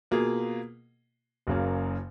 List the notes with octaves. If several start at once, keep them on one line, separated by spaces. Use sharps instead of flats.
B2 A#3 F4 G#4
F#1 F#2 C#3 F#3 A#3